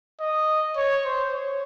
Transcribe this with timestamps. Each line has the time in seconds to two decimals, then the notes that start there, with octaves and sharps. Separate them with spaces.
0.20 D#5
0.76 C#5
1.05 C5
1.33 C#5